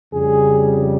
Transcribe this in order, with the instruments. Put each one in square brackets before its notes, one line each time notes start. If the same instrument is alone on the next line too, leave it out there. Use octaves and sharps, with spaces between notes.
[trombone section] F2 C#3 G3 G#4